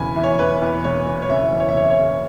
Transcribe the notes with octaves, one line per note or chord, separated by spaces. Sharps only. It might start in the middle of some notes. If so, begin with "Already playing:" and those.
Already playing: E1 E2 C#3 G#5 B5
E3 E5
C#5
E5
E2 B4
E2
E1 C#5
E1
C#5
F#1 E5
E2
C#5
E5
F#1 C#5
E5
C#5
C#3